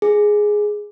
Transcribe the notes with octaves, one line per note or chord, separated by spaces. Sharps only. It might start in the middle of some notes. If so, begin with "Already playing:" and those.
G#4